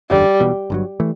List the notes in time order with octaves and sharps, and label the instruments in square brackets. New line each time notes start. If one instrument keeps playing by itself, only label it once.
[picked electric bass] F#1 E2 D3 [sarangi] G3
[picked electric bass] E1 E2 B2
G1 G2 F#3
E3 A3